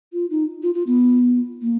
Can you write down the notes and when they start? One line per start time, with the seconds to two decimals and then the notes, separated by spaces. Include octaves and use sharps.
0.13 F4
0.30 D#4
0.62 F4
0.74 F4
0.87 B3
1.62 A#3